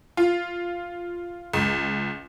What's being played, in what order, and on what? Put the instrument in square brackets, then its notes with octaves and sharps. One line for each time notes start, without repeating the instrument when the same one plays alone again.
[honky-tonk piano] F4
C#2